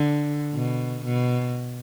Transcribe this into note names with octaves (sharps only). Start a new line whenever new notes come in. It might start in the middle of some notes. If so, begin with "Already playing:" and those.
Already playing: D3
B2
B2